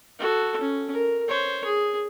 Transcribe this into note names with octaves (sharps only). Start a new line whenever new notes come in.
F#4 A4
C#4
A#4
C5 C#5
G#4